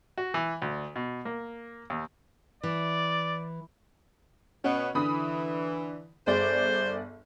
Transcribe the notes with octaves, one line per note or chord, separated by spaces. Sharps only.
F#4
E3
D2
B2
A#3
D#2
E3 D5
B2 B3 C#4
D3 E3 B5 D#6
G1 G#4 C5 D5